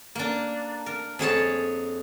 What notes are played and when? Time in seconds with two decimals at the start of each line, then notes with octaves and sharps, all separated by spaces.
0.15 A#3 D4
0.86 A#4
1.19 F2 G#4 C#5 A5